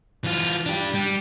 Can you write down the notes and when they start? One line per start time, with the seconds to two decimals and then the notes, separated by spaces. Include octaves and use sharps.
0.24 E3 F4
0.66 D4 G4
0.95 G3